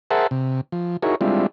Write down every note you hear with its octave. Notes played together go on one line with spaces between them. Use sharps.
G#4 A#4 C5 E5 F#5 A5
C3
F3
D#4 E4 F#4 G#4 A#4 C#5
G3 G#3 C4 D4 E4 F4